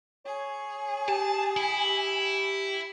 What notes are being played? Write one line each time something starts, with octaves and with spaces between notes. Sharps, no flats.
G#4 C#5
G4 A5
E4